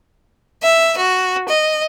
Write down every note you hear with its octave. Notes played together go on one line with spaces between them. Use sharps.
E5
F#4
D#5